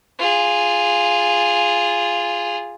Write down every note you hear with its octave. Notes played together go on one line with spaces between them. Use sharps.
F4 G#4